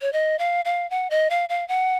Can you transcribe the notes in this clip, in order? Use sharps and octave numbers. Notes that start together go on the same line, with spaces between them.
C#5
D#5
F5
F5
F#5
D#5
F5
F5
F#5